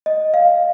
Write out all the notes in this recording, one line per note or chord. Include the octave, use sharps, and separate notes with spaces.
D#5
F5